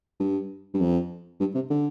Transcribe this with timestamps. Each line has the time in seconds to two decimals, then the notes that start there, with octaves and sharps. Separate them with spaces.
0.20 G2
0.74 G2
0.80 F2
1.40 G2
1.55 C3
1.70 D3